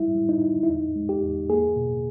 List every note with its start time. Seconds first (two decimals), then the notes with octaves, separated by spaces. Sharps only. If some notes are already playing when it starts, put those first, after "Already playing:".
Already playing: G3 E4
0.15 G3
0.29 D#4
0.42 D#4
0.63 E4
0.69 E2 D#4
0.96 G#3
1.09 G4
1.23 E2
1.50 A#3 G#4
1.76 B2